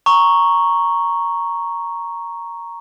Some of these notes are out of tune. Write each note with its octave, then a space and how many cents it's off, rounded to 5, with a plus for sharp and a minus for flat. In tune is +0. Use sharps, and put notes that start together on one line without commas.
A#5 +0 C#6 +0